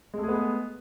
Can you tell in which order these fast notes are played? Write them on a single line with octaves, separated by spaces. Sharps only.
G#3 A3 G#4 B3